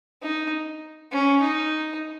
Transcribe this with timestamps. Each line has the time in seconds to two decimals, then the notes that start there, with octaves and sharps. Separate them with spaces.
0.22 D#4
1.12 C#4
1.41 D#4